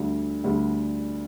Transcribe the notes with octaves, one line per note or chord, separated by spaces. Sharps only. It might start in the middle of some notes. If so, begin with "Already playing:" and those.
Already playing: D2 D3 G3
D2 D3 G3